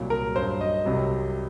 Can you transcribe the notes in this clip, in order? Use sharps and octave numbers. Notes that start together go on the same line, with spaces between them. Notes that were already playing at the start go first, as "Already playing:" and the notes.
Already playing: C2 A#2 F#3
A#4
G2 F#3 C5
D#5
C2 C3 F#3